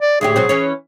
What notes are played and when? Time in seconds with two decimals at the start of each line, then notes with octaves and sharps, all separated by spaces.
0.01 D5
0.21 D2 A2 G4 G#4
0.36 B2 F#3 C4
0.49 E3 C#4 C#5